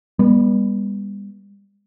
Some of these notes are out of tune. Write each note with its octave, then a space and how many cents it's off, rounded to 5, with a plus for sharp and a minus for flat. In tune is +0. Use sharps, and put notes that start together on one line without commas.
G3 +35 B3 -25